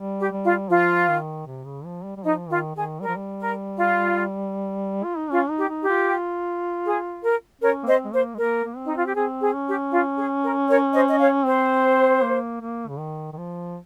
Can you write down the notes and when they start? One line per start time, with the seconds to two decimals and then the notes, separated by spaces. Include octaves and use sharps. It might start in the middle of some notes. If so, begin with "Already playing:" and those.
Already playing: G3
0.18 G4
0.32 G3
0.44 F4
0.69 F3 F4
1.09 D#3
1.46 C3
1.66 C#3
1.85 F3
2.04 G3
2.17 G3
2.23 F3 D#4
2.49 D#3 F4
2.75 D#3 G#4
3.00 G3 A#4
3.08 F3
3.16 G3
3.39 A#4
3.77 F4
5.04 F4
5.18 D#4
5.30 C#4 F4
5.50 D#4
5.57 G4
5.69 D#4
5.82 G4
5.89 F4
6.85 G#4
7.23 A#4
7.61 C#4 A#4 C#5
7.83 A#3
7.87 C4 C5 D#5
8.04 G#3
8.13 A#3 C5
8.34 G#3
8.38 A#3 A#4
8.65 A#3
8.77 C4
8.85 D#4
8.96 F4
9.06 G4
9.15 C4 G#4
9.41 G#4
9.54 C#4
9.67 G4
9.92 F4
10.17 G#4
10.43 A#4
10.69 A#4 C#5
10.94 C5 D#5
11.09 D#5
11.20 C#5 F5
11.45 C4 C5
12.22 A#3
12.61 A#3
12.88 C#3
12.99 D#3
13.33 D#3
13.38 F3